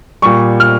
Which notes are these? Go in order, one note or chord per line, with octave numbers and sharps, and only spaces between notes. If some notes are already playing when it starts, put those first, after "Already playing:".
A#2 G3 C#6
F6